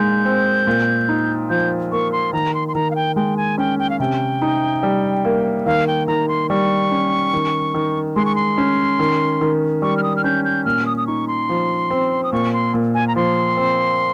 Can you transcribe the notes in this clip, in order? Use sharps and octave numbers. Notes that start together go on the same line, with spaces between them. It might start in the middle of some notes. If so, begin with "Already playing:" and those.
Already playing: A#2 G#3 D#4 G6
C4
A#2
D#4
F3 G6
A#3 C#6
C6
D#3 A#5
C6
C6
D#3 A#5
F5
G5
G#3 G5
G#5
C#4 G5
G5
F5
C3 G5
D#4
G3
A#3
D#3 F5
G5
D#3 A#5
C6
G3 C#6
C#4
D#3
D#3
G#3 C6
C#6
C6
C#4
D#3
D#3
G3 C#6
F6
D#6
F6
C#4 G6
G6
A#2 F6
D#6
D#6
D#4 C#6
C6
F3
C4
D#6
A#2 C#6
C6
A#2
G#5
A#5
F3 C6
C4